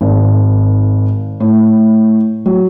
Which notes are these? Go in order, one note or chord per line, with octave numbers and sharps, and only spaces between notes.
G#1
A2
F#3